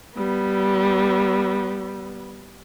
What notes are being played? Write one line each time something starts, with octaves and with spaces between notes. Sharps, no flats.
G3 B3